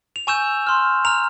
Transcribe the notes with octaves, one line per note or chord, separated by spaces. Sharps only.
F7
G#5 C#6 E6 G6 E7
C6 F6
A#5 F6 F7